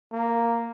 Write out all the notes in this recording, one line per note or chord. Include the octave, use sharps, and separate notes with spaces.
A#3